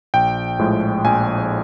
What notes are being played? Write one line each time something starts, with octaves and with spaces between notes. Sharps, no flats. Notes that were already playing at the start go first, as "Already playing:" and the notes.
A#1 G5
A2 F3 G#3
A#1 G#5